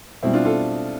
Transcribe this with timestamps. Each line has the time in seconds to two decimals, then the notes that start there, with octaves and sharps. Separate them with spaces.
0.23 B2 G3 C4 E4
0.34 D4 F4
0.45 F4 A4